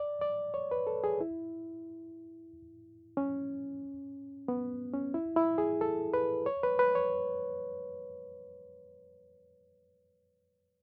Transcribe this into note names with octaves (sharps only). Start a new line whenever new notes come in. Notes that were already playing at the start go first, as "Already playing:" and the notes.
Already playing: D5
D5
C#5
B4
A4
G#4
E4
C#4
B3
C#4
E4
E4
G#4
A4
B4
C#5
B4
B4
C#5